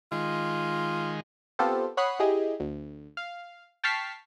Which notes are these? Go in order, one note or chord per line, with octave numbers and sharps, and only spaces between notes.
D#3 G#3 F4
B3 C4 F4 G4 A4 C5
C#5 F#5 B5 D#6 F#6 C7
E4 G4 G#4 D#5
D2
F5
G5 A5 C#6 F6 B6 C7